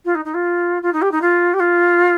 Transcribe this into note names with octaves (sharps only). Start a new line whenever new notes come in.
F4
D#4
D#4
F4
F4
D#4
G4
D#4
F4
G4
F4